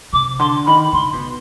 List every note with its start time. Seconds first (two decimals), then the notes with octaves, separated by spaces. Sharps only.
0.13 C3 D6
0.39 D3 C6
0.66 D#3 B5
0.93 D3 C6
1.13 B2